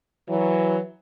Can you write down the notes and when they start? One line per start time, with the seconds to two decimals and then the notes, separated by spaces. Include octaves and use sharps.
0.29 E3 F#3